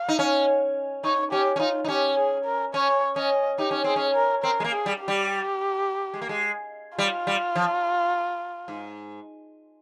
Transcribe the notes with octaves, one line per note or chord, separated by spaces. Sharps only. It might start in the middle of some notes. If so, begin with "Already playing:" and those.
Already playing: F5
D#4
C#4
D#4 C#5
C#4 G4
C#4
D#4 F4
D#4
C#4 G4
G#4
A#4
C#4 C#5
C#4 D#5
D#4 G4
C#4
C4 G#4
C#4
A#4
C4 A#4
G#3
A#3
G#4
G3
G4
G3
G#3
A#3
G#3
G3 F4
G3
F3
G#2